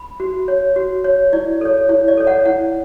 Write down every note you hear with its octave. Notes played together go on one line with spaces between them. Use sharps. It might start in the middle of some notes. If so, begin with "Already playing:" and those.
Already playing: B5
F#4
C#5
F#4
C#5
E4 D5
A4 C#5
E4 C#5
D5
A4 C#5
F#5
E4 F#5